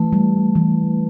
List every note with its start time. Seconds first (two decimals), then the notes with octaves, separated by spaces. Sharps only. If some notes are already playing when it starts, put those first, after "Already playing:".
Already playing: E3 A3
0.13 G3
0.55 E3